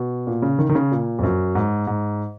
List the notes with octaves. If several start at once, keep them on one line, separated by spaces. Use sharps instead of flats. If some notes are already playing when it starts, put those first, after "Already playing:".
Already playing: B2
A#2
C#3
D#3
D#3
C#3
A#2
F2
F#2
G#2
G#2